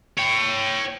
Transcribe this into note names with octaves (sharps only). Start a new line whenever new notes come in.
C#5 G5